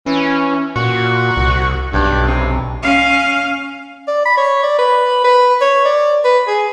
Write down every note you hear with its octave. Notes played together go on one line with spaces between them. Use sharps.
E3 C#4
A#2 F#4
C2
B1 G2
C3
C#4 F5
D5
B5
C#5
D5
B4
B4
C#5
D5
B4
G#4